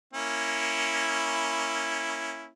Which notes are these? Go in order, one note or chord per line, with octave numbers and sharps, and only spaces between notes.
A#3 C#4 E4